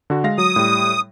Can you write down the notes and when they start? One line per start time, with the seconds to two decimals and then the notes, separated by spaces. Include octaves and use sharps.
0.10 D3 F#4
0.24 G#3 F5 A#6
0.38 F#3 D#6
0.56 A2 G3